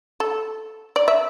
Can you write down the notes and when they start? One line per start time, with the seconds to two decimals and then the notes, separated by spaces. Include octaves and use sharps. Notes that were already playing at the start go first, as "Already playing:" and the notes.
0.20 A4
0.96 D5
1.08 E5